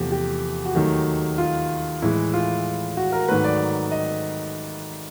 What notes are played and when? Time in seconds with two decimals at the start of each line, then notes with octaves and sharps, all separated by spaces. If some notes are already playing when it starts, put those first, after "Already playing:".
Already playing: E2 C3 F3 A3 G4
0.12 G4
0.65 F#4
0.75 D#2 D#3 F#3 A3 G4
1.38 F4
2.02 A2 E3 G#3 E4
2.34 F4
2.97 F#4
3.12 A#4
3.28 G#2 D#3 F#3 A3 B4
3.44 D5
3.91 D#5